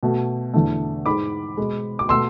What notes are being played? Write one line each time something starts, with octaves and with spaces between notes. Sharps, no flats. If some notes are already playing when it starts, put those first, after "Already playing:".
B2 A3
E2 D3 A3
G#2 G#3 B5 D6
B2 G#3
D6
B2 A3 C6 E6